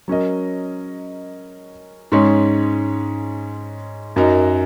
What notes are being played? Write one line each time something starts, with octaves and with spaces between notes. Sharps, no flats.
F#3 C#4 A#4 D#5
G#2 G#3 C#4 G#4 C#5
F#2 F#3 D#4 A#4